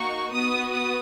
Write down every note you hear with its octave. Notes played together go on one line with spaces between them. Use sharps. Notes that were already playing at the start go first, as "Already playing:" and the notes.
Already playing: A#3 D#4 F#4 C#6
B3 F#4 D#6
D#6